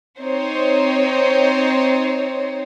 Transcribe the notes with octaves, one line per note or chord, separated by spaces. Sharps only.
C4 D#4 C5 C#5